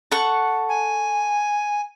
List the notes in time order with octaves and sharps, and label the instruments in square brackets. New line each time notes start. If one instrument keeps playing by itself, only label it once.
[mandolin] A4 F#5 C#6
[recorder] G#5